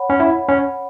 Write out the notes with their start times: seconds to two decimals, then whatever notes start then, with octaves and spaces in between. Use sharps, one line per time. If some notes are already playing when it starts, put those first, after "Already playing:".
Already playing: C#5 F#5 B5
0.10 C#4
0.20 E4
0.49 C#4